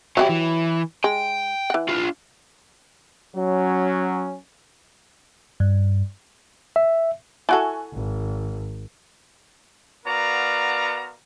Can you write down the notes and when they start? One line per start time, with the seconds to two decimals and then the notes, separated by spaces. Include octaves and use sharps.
0.17 F#3 C#4 E4 F#4 G4
0.29 E3
1.04 G#3 G5
1.70 E3 F#5
1.89 D4 F4
3.36 F#3 C#4
5.60 G2
6.76 E5
7.49 E4 F#4 A4 G#5 C#6 F#6
7.93 G#1
10.06 B3 F#4 A#4 D5 F5 A#5